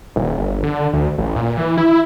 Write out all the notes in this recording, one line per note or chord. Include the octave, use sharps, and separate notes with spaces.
D#1
G1
D3
D2
A1
A#2
E3
E4